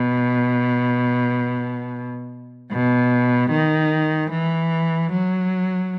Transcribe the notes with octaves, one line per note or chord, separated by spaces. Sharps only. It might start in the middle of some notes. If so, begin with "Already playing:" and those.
Already playing: B2
B2
D#3
E3
F#3